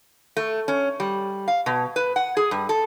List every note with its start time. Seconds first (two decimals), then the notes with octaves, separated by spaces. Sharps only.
0.37 A3
0.68 C#4
1.00 G3
1.48 F5
1.66 B2
1.96 B4
2.16 F#5
2.37 G#4
2.51 G2
2.69 A4